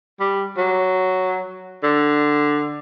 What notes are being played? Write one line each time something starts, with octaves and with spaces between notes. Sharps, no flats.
G3
F#3
D3